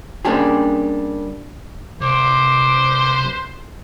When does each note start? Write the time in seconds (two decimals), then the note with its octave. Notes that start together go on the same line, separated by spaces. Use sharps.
0.25 G3 A#3 C#4 D4 G4 G#4
2.01 C2 B4 C5 D6